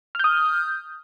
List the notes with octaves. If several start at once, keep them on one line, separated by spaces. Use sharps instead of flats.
D#6 F6 G6